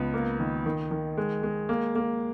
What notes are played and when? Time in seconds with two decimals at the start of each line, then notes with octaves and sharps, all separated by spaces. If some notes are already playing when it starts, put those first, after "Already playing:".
Already playing: C#2 B3
0.14 A#3
0.40 D#3
0.66 D#3
0.91 D#3
1.17 G#3
1.43 G#3
1.69 A#3
1.95 A#3